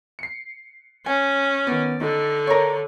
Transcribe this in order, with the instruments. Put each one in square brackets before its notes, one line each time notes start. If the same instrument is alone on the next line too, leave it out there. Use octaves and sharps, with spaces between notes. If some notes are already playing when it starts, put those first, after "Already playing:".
[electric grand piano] C7 C#7
[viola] C#4 [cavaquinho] G#5
[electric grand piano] D#3 B3 [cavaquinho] D5
[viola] D3 [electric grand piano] D#4
[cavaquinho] A#4 C#6 [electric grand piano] C#5 D5